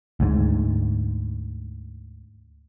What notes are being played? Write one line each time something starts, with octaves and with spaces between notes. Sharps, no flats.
D2 G#2